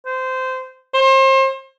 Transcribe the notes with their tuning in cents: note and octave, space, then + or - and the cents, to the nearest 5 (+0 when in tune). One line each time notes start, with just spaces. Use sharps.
C5 -15
C5 +35